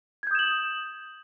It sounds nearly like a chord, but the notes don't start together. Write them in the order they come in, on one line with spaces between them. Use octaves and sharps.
G#6 G6 D#6 E7 F#7